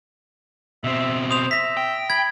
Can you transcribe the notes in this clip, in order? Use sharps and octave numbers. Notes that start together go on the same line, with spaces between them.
B2 C4 E5
C5 D#6 F7
E5 A#6 B6
G5
B5 G#6